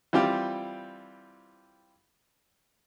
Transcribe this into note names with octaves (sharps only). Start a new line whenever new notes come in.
E3 G3 C4 F4 G4